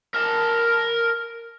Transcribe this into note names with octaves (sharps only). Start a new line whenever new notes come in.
A#4 A5